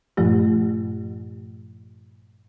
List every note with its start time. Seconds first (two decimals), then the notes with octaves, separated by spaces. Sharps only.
0.17 G2 A#2 F3 A3 G4